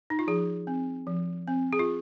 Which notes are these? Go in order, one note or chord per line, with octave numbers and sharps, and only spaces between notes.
D#4
F4
F3 G#4
C4
F3
C4
G#4
F4